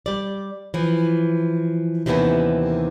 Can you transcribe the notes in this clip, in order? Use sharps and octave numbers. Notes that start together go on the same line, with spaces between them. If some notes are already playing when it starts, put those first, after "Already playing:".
G3 D5
E3 F3
D#2 C3 D#3 E3 B3 C#4